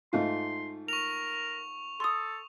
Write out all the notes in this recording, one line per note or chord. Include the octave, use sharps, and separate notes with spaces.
G#2 A3 F4 C6
A#4 C#6 F7
A4 C6 D#6